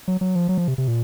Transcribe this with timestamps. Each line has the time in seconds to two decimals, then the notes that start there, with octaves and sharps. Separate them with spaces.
0.08 F#3
0.21 F#3
0.35 F3
0.49 F#3
0.58 F3
0.68 C3
0.78 C3
0.88 A#2